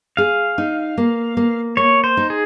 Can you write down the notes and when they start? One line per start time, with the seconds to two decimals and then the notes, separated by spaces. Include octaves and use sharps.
0.17 G#4 F5
0.58 D#4
0.98 A#3
1.37 A#3
1.77 A#3 C#5
2.04 C5
2.17 D#4
2.30 G#4